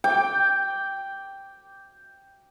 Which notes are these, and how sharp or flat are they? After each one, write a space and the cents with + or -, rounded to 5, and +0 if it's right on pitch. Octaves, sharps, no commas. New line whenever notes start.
G5 +0 D6 -10